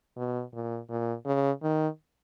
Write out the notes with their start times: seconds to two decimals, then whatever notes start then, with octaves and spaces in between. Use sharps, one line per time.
0.17 B2
0.53 A#2
0.89 A#2
1.26 C#3
1.62 D#3